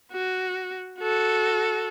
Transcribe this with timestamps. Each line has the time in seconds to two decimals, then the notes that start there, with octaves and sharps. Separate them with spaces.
0.12 F#4
0.99 F#4 A4